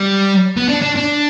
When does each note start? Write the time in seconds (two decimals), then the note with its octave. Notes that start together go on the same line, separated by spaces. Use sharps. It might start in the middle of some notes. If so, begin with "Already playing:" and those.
Already playing: G3
0.57 B3
0.69 D4
0.82 D4
0.96 D4